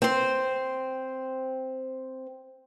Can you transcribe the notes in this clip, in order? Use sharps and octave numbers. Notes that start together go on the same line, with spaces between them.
C4 C5